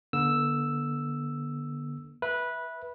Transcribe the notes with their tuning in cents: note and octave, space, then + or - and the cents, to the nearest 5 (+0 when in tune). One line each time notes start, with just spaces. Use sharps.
D3 -5 B3 -40 E6 +0
B4 -15 E5 -10